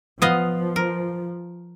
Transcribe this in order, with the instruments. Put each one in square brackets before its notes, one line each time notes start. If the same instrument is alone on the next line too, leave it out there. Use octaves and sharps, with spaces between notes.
[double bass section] F3 [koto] B3 D#5 F5
[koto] A#4